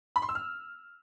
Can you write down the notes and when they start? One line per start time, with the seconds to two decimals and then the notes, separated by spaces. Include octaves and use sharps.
0.16 B5
0.22 C6
0.29 E6
0.35 F6